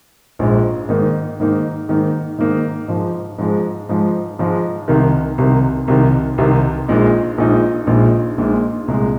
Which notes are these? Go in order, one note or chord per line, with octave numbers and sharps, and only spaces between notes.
A#1 G#2 G#3
G#2 D#3 A#3 D#4
G#2 D#3 A#3 D#4
G#2 D#3 A#3 D#4
G#2 D#3 A#3 D#4
G#2 F3 G#3
G#2 F3 G#3
G#2 F3 G#3
G#2 F3 G#3
C2 C3 D#3
C2 C3 D#3
C2 C3 D#3
C2 C3 D#3
A#1 A#2 G#3 D#4
A#1 A#2 G#3 D#4
A#1 A#2 G#3 D#4
A#1 A#2 G#3 D#4
C2 A#2 G#3